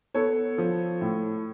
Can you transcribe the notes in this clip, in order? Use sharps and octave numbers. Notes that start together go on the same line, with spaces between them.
B3 A4 C#5
F3
A2